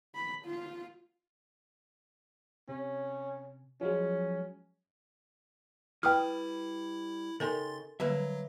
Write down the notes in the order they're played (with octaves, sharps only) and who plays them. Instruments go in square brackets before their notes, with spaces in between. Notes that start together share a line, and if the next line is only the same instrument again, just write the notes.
[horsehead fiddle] B5
F4
[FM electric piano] C3 [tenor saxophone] C#4
[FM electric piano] F3 F#3 G#3 [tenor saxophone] C#4
[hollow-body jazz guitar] G3 B4 [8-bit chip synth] E4 [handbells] G5 D#6 F6
[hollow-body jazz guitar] C#3 D#4 G4 [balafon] A4 A#4 G#5 [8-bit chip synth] C6 A6
[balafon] D3 G3 [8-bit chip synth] F#3 [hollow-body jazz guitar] A#3 B4 E5